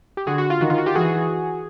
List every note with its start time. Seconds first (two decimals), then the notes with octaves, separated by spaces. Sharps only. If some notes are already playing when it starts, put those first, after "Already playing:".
0.17 G4
0.27 D3 F#4 G#4
0.38 F#4
0.50 F4
0.61 D#3 F#4
0.70 F4
0.78 F#4
0.86 F4 G4
0.95 E3 F#4 G#4